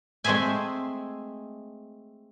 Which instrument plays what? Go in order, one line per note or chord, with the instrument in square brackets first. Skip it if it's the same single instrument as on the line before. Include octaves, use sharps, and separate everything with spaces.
[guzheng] G#3 A3 C4 G#4 E5 G#5